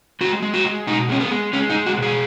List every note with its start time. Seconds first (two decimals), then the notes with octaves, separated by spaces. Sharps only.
0.21 G#3 F#4
0.42 G#3
0.54 F#4
0.65 G#3
0.87 B2 D#4
1.09 G#3 C#4
1.20 B3
1.31 G#3
1.53 G#3 C#4
1.70 D#4
1.75 G#3
1.86 F#4
1.97 B2
2.02 G#4